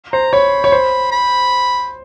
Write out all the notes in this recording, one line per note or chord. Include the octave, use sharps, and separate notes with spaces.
C5 A#5
C#5 B5
C#5
C5
B5